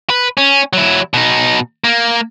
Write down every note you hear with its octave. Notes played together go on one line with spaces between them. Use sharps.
B4
C#4
F#3 E4
B2 D#4
A#3